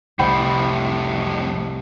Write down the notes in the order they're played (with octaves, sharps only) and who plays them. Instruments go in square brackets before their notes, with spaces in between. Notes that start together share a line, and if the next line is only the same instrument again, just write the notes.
[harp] C2 G5 B5 [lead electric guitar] F2 A2